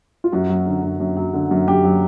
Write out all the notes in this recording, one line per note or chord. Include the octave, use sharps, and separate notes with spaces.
F4
F#2 F#4
F#3
D3
F#2
F#2
F#3
D3
F#2
F#2 G4
F#3